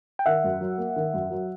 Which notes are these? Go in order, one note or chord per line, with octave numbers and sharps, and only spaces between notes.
G5
D#3 E5 F#5
F#2
F#3
A#3
D#3
F#2
F#3